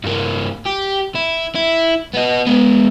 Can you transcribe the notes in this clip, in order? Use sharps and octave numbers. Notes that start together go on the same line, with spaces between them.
G2 A#3
G4
E4
E4
B3 D#5
G#3 B3